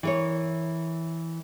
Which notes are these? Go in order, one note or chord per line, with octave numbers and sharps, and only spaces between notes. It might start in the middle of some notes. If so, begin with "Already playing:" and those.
E3 A#4 C#5